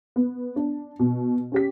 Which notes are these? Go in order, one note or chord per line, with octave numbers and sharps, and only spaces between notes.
B3
D4
B2
C#4 G4 B6